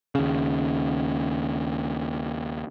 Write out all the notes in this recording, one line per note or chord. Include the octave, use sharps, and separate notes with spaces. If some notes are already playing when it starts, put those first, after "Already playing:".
D#2 C#3